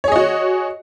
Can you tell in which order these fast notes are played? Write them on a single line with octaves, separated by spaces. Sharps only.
C#5 G#4 D#5 F#4